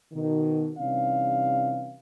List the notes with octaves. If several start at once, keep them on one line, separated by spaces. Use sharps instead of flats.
B2 D#3
C3 E3 G3 C#4 D#4 F5